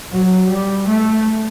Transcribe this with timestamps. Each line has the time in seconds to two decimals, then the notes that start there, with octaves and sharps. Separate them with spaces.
0.12 F#3
0.49 G3
0.87 A3